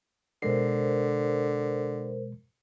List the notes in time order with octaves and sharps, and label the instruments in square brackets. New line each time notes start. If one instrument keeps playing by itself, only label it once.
[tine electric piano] B2 G#3 C7 [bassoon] D3 [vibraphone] A#4 C5